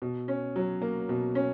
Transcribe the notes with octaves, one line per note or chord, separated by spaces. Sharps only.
B2
C#4
F#3
A#3
B2
C#4